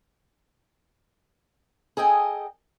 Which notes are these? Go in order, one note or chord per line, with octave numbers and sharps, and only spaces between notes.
G#4 A4 D#5 G5 G#5